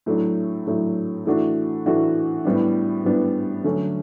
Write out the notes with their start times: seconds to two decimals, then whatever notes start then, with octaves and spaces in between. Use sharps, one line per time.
0.06 A2 F#3 A3 D4
0.67 A2 F#3 A3 D4
1.25 A2 E3 A3 D4 F#4
1.86 A2 E3 A3 D4 F#4
2.45 A2 G3 B3 D4
3.04 A2 G3 B3 D4
3.64 D3 F#3 A3 C#4